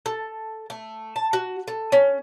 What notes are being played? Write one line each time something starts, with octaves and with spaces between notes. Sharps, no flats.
A4
A3
A5
F#4
A4
C#4